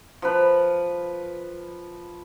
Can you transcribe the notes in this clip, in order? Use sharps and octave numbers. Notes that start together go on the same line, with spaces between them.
F3 B4